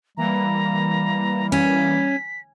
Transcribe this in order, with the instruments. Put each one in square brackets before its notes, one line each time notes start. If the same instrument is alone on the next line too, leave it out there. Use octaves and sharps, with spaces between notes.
[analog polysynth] E3 A#3 [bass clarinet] G3 [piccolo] A#5
[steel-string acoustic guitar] C#4 [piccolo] B6